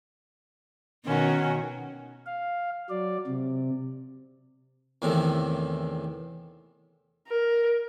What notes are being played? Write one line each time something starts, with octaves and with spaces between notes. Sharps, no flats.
B2 D#3 C#4 F#4
F5
F#3 D5
C3
E2 A2 C3 D#3 E3
A#4